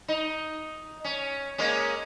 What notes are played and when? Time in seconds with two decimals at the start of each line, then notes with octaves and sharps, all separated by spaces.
0.08 D#4
1.04 C#4
1.58 G#3 A#3 C#4